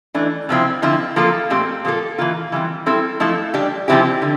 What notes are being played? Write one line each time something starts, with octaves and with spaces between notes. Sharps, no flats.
E3 A3 D4
C3 F3 C4 E4
D3 F3 C4 E4
F3 A#3 F4 A4
A#2 A3 C4 G4
A#2 F3 A#3 F4 A4
E3 A#3 F4
E3 G3 C4
G3 C4 E4 A4
F3 A3 E4 A4
G3 D4 G4
C3 F3 C4 E4 G4
D3